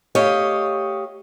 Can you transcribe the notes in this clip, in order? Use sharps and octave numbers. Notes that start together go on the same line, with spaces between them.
A3 G4 C#5 D#5 F5